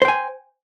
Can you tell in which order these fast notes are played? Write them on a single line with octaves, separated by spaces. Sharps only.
C5 G5 G#5